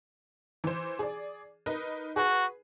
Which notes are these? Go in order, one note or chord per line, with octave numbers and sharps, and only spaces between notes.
E3 C5
G#4 D5
D#4 A#4 B4
F#4 G#4 B4